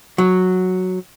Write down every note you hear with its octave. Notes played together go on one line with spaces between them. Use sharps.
F#3